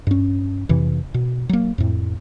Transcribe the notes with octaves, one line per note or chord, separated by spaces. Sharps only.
G2 C#4
F2 C3 E3
B2
F#3 A#3
F2 A2